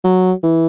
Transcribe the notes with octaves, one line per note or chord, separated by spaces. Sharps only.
F#3
E3